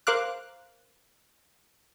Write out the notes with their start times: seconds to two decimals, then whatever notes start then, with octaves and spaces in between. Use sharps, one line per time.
0.07 A#4 C5 F5 D6 F6 F#6